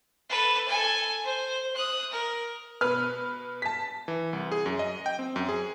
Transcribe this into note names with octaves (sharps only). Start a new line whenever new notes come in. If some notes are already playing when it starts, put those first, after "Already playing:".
A4 B4
A4 G#5
C5
D#6 F#6
A#4
B2 B4 F6
A5 B6
E3
C2
G#4
F#2
D#5
G5
C4
F#2
G#4